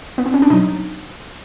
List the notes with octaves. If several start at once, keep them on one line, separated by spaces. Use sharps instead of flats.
B3
C4
C#4
D4
B2 F#3 D#4